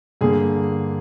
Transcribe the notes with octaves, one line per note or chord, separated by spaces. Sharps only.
G2 D3 G3 A#3 G#4